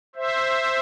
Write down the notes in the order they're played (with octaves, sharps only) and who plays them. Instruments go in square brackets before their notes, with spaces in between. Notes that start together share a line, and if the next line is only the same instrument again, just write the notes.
[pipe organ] C5 E5